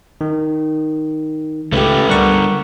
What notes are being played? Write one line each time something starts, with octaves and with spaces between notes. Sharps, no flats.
D#3
C#2 A3 G4 B4
D3 G3 A#4 F#5 C#6